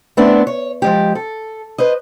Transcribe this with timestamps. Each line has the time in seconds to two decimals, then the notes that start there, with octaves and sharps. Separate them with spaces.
0.17 A3 B3 C4 D4 E4
0.47 C#5
0.82 F3 G#3 G4
1.15 A4
1.78 B4 C5 D#5